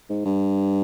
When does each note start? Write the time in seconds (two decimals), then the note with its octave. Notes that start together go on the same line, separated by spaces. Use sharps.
0.10 G#2
0.26 G2